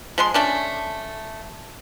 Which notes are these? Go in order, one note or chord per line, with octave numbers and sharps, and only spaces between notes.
F3 G#3 C6
A3 C#4 D4